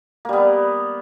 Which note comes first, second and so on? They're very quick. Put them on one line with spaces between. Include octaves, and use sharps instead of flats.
A#3 G3 B3